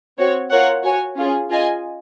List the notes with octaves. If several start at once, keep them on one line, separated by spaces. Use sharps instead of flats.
C4 F#4 C#5
F4 A#4 C#5 F#5
F#4 C#5 G#5
C#4 F4 G#4
F4 G#4 D#5 G#5